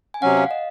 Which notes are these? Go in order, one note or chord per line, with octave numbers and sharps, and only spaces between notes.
G#5
C3 F#3 C#4 F#5
F5
D#5